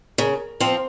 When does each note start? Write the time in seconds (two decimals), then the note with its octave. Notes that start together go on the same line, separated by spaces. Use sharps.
0.18 C#3 A#4
0.60 F3 C4 C5